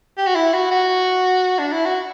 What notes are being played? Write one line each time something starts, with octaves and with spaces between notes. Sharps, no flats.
G4
F#4
E4
F#4
F#4
D4
E4
F#4